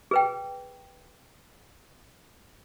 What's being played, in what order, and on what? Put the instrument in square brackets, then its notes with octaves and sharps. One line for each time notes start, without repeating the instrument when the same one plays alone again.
[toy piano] G#4 B4 G5